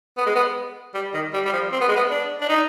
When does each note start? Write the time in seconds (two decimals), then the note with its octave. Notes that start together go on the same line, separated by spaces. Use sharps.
0.17 B3
0.26 G#3
0.35 B3
0.94 G3
1.14 D#3
1.33 G3
1.45 G3
1.53 F3
1.72 C4
1.80 B3
1.88 G#3
1.96 B3
2.11 D4
2.41 D4
2.49 D#4